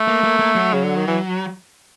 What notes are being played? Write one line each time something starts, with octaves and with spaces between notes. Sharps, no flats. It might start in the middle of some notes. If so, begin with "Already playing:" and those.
Already playing: A3
A#3
A#3
A#3
F#3
C#3
D3
D#3
E3